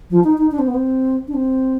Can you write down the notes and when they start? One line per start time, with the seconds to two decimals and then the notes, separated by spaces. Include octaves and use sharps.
0.10 F3
0.24 D#4
0.38 D#4
0.52 D4
0.59 C4
0.67 B3
0.74 C4
1.28 D4
1.34 C4